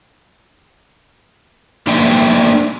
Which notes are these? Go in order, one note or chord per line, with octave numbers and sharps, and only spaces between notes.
A#3 D4 D#4 D5 E5 G5